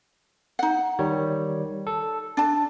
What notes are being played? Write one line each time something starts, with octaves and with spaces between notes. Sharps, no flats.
D#4 F#5
D#3 G3 C#5
A4
D4 A5 A6